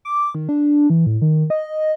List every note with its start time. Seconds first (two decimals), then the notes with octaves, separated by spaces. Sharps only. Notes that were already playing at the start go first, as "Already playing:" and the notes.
0.05 D6
0.35 D#3
0.49 D4
0.90 E3
1.06 A2
1.22 D#3
1.50 D#5